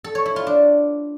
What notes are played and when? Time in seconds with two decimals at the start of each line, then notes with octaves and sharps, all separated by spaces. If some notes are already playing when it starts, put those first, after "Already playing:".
0.04 A4
0.15 C#5
0.26 E4
0.36 F4
0.47 D4